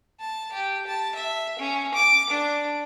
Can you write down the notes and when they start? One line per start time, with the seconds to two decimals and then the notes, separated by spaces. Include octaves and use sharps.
0.20 A5
0.53 G4
0.87 A5
1.15 E5
1.59 C#4
1.94 D6
2.30 D4